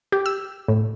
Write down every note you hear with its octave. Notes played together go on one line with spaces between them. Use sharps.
G4
E6
A2